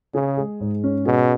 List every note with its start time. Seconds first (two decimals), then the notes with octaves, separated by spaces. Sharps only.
0.14 C#3 G#4
0.37 G#3
0.60 G#2
0.84 C#4
1.06 B2 G#4